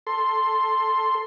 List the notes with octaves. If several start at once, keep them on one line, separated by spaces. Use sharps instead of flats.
A4 C6